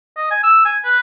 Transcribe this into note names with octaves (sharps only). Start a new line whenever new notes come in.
D#5
G#5
E6
G#5
B4